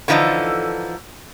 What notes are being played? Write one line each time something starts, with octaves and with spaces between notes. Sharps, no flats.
D3 E3 F3 D#4 A4